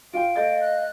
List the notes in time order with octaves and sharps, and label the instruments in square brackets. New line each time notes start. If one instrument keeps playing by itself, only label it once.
[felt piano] F4 G5 [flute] F5 [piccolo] D7
[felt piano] A3 G6 A6 [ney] D#5
[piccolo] F#6